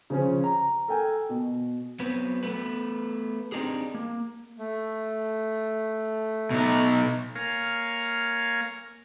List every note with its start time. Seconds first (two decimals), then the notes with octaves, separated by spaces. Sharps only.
0.10 C#3 F3 C#4
0.44 A#5
0.88 A4 A#4 G5 G#5
1.29 B2
2.00 F#3 B3 C4 B4
2.43 A3 B3 B4
3.52 C4 D4 D#4 G4 G#4
3.94 A#3
4.59 A3
6.51 B2 D#4
7.35 A#3 A#4 C#5 F5 G#5